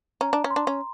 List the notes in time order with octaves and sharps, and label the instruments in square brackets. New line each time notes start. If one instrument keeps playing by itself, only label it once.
[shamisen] C#4 [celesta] A#5
[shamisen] D4
C#4
[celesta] C6
[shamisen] D4
C#4